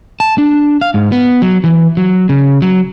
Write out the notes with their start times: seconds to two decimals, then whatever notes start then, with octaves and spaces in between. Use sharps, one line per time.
0.20 A5
0.38 D4
0.81 F5
0.94 G#2
1.12 B3
1.42 F#3
1.64 E3
1.97 F#3
2.29 C#3
2.62 F#3